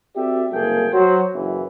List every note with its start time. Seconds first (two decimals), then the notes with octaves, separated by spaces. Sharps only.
0.17 C4 F#4 G4 A4 D5 E5
0.52 F#1 C2 A3 A#3 G#4 G5
0.94 F#3 C5
1.34 F#1 F#2 E3